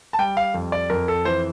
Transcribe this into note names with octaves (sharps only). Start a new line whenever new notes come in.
A5
G3 G5
F5
F2
D5
F2 A#4
A4
E3 C5